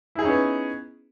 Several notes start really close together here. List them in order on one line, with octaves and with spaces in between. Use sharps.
E4 G#4 D#4 C#4 B3